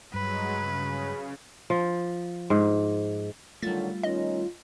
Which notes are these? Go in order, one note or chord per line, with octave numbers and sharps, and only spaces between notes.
G2 F#3 G#3 B4
C#3
F3
G#2
D3 D#3 F#3 G3 A3 F4 A6
D#3 C#4 D#4 D#5